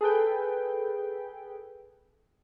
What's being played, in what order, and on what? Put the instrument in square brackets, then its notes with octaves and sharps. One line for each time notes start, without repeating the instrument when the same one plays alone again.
[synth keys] G#4 A4 B4 G5